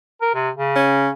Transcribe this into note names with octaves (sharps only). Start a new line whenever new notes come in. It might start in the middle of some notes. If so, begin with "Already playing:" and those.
A#4
C3
C#3
C#4